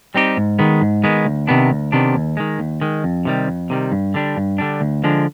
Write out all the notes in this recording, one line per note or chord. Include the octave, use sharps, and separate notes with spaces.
G3 C4 D#4 G4
G#2
D#3 G#3 B3
G#2
D#3 G#3 B3
D2
C3 D#3 B3 D4
D2
C3 D#3 B3 D4
D#2
D#3 G#3
D#2
D#3 G#3
F2
C3 D#3 G3
F2
C3 D#3 G3
G2
D3 G3 D4
G2
D3 G3 D4
D2
D3 F3 G#3 D4